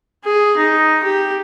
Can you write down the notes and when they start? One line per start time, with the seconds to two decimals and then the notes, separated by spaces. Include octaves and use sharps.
0.25 G#4
0.57 D#4
1.03 G4